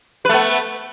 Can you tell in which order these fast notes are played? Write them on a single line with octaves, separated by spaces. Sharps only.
B4 A3 B3